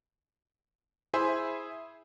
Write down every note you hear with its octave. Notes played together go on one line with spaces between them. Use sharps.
E4 G#4 C5 E5 G#5